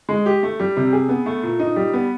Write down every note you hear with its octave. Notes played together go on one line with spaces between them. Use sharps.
G#3
G4
A3
G3
C3
G#4
B3
A3
A#2
D#4
G3
B3